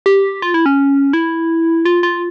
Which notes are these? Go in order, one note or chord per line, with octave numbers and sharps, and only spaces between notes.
G4
F4
E4
C#4
E4
F4
F4